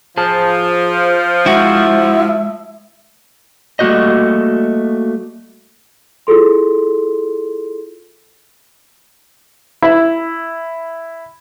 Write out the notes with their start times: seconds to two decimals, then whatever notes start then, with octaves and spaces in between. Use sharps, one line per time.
0.17 F3 G#4 C5 A5
1.46 G#3 E4 F#4 E5
3.79 G3 A3 A#3 F#4 C5 D#5
6.27 E4 F4 G#4 A4 C6
9.82 E4